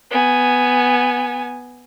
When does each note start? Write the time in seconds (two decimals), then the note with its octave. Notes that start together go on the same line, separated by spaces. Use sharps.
0.11 B3 G#5